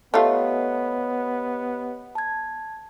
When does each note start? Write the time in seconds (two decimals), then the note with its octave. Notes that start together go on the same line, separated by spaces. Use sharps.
0.14 A3 B3 F4 G4 C#5 D#5
2.15 A5 G#6